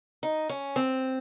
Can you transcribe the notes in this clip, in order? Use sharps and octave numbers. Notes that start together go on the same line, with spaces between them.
D#4
C#4
C4